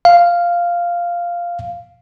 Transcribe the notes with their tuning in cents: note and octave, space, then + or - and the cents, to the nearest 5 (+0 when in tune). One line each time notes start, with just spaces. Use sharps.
F5 -5